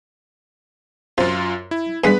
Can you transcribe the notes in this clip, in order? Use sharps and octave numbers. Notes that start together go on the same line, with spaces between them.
F#2 C3 F4
E4
G2 G3 G#3 B3 B4 B6